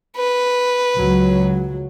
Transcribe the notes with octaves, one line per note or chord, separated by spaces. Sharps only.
B4
C#2 F#3